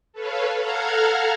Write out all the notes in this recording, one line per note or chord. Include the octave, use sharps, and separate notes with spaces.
A4 B4 C#5 F5
A4 F5 F#5 A#5 F6 G#6